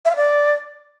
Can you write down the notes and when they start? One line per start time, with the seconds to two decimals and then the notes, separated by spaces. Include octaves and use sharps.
0.05 E5
0.11 F5
0.16 D5